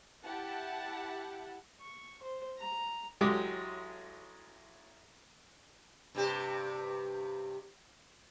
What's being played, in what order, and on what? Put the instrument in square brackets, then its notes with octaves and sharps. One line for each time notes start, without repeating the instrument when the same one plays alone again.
[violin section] E4 G4 F#5 A5
[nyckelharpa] C#6
C5
A#5
[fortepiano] A1 F#3 G#3 G4 D6
[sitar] G2 C3 G4